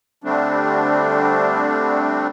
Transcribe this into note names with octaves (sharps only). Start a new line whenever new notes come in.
D3 G3 A3 C4 D4